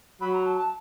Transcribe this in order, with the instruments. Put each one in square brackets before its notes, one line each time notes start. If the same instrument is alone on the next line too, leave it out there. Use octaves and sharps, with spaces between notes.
[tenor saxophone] F#3 [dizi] B5
[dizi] A#5
A5
A5